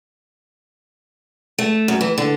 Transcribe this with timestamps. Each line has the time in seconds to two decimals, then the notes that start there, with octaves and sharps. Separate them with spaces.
1.59 A3
1.88 F#2
2.01 E3
2.18 D3